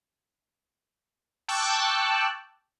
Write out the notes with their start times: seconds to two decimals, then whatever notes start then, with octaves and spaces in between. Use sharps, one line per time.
1.48 G5 A5 C#6 D6 E6 F#6